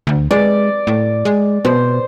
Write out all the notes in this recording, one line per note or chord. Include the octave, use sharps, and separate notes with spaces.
D2
G#3 D5
A2
G#3
B2 C5